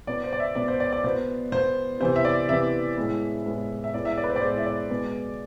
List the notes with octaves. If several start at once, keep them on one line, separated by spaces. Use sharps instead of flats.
B2 B3 D5
C5
D5
E5
B2 B3 D5
C5
D5
D5
B2 B3 C5
B2 B3 C5
C3 E3 B3 C5
E5
D5
C3 E3 B3 E5
A2 G#3 B3
A2 G#3 B3
E5
A2 G#3 B3 D5
E5
D5
B4
C5
D5
A2 G#3 B3 C5
E5
D5
B2 G#3 B3